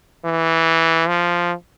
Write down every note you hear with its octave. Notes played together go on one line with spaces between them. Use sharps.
E3
F3